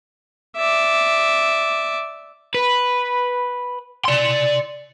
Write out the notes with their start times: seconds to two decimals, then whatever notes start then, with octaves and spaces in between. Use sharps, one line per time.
0.57 D5 E5
2.54 B4
4.05 D5 C6